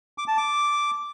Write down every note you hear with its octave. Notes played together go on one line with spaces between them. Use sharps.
D6
A5
D6